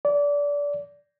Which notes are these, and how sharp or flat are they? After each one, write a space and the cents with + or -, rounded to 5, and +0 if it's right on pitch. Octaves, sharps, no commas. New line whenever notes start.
D5 -25